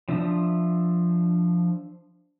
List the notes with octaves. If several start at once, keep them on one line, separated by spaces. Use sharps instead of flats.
F3 D4 E5 D#6